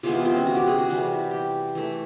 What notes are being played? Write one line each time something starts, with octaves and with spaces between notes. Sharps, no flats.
C3 E3 G#3 B3 F4
F4
C4
C#4
F#4
G4
G#4
F#4
C3 E3 G3
G4
E3 A3